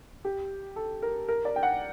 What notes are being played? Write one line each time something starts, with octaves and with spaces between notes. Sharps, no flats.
G4
A4
A#4
A#4
D5
G5
F#5